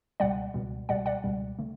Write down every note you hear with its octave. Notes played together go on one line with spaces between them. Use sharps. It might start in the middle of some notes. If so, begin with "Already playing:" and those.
C#2 B2 G3 D5 F#5
C#2 B2 G3
C#2 B2 G3 D5 F#5
D5 F#5
C#2 B2 G3
D3 A3